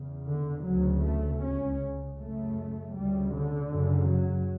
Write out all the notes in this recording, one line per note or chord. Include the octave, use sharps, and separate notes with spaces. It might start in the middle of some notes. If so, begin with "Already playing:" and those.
Already playing: E2 C#3
D3
D2 C#3 F#3
A3
C#2 C#3 C#4
F#2 C#3 A3
D2 C#3 G3
D3
F#2 C#3
F#3